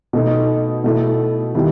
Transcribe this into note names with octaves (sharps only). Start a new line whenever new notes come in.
B2 A3 D#4
B2 A3 E4
D#3 G3 B3 E4